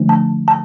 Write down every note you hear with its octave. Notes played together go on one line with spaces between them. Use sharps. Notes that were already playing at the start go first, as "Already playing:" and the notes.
Already playing: D3 F3 A3 D4
A5
A5